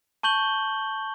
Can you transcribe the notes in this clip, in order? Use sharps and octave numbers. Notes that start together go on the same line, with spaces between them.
A5 C#6 G6 F#7 G7